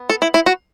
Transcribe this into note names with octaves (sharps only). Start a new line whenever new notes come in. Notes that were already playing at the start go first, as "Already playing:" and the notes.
Already playing: B3
A4
E4
E4
F#4